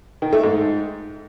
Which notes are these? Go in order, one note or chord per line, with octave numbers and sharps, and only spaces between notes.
D#3
A3
G#2